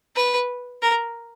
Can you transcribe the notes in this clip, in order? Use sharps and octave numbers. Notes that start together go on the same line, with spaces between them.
B4
A#4